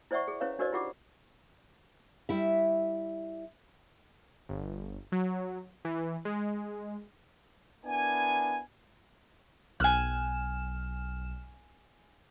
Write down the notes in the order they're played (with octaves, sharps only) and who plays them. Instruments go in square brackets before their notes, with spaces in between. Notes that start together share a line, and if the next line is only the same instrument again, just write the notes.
[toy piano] E4 C5 D5 E5 F#5 C#6
G#4
C#4 E4 B4 C#5 F5
D4 F#4 A#4 C5 D5 D#5
E4 F4 G4 F#5 D6
[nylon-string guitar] G3 E4 E5
[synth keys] G1
F#3
E3
G#3
[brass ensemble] B3 D4 E4 A#4 G#5
[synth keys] B1 F6 E7 [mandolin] G#5 F#6